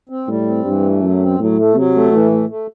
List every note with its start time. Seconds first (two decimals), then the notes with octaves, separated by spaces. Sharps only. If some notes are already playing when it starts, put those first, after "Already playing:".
0.09 C4
0.27 A2 G3
0.46 C4
0.65 G2 E3
0.83 A3
1.02 F#2 F#3
1.20 C4
1.38 A2 F#3
1.57 A3
1.76 C3 F#3
1.95 A3
2.12 A2 E3
2.31 A3
2.49 A3